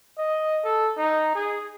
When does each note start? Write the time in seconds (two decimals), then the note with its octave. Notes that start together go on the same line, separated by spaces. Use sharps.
0.18 D#5
0.64 A4
0.97 D#4
1.35 G#4